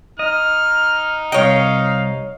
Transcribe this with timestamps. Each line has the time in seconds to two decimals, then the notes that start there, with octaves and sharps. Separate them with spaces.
0.19 D#4 D#5 F6
1.32 C2 C#5 D#5 F5 G5